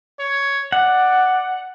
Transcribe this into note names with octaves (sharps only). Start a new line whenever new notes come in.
C#5
D5 F#5